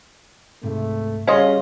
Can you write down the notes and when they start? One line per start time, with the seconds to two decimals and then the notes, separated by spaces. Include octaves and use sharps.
0.63 C#2 G#2 C3 A3
1.27 C#3 G3 C#4 F#4 D#5 F5 C6